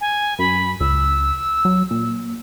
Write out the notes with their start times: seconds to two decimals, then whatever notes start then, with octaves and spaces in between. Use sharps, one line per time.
0.01 G#5
0.39 F#2 B5
0.80 C#2 E6
1.65 F#3
1.91 A#2